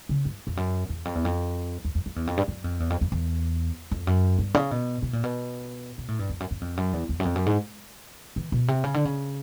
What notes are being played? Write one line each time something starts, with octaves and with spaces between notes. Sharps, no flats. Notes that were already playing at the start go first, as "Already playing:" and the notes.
C#3
G2
F2
F#2
E2
F2
E2
F2
E2
F2
F2
E2
F2
G2
F#2
F2
E2
F2
F2
E2
F2
F#2
G2
C#3
B2
B2
A#2
B2
B2
A2
G2
F2
F#2
F#2
F2
F#2
E2
E2
F#2
F2
F#2
G#2
E3
B2
C3
C#3
D3
C#3